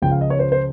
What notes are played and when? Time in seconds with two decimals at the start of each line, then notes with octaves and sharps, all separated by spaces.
0.02 C#2 C#3 F3 G5
0.11 F5
0.21 D#5
0.30 C#5
0.39 C5
0.52 C5